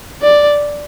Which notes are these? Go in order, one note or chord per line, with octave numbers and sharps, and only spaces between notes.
D5